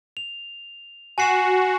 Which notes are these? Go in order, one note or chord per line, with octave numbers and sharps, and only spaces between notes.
F7
F#4 G#5 C7 E7